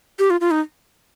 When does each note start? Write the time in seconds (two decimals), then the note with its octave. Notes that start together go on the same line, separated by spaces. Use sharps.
0.19 G4
0.30 F4
0.41 F4
0.51 D#4